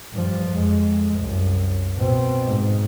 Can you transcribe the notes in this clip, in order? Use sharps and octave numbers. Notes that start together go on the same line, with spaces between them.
G2 F3
F2 G#3
C2 F#2
B2 C4
G#2